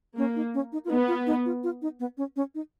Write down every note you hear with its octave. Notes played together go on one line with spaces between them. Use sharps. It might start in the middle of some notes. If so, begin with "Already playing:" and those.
A#3 C#4
D#4
C#4
D#4
F4
B3 D#4
F4
D#4
F4
F4
D#4
B3
C#4
C#4
D#4